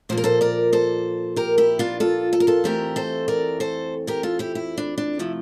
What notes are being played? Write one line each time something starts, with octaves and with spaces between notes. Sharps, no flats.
A#2 F3 A#3 C5
A#4
A4 C5
A#4 D5
A4 C5
G4 A#4
E4 G4
D4 F4
F4 A4
A4
A#4
F4 A4
F2 E3 A3 C4 G4 A#4
A4 C5
A#4 D5
A4 C5
G4 A#4
F4 A4
E4 G4
E4
D4
D4
C3 F3 A3 E4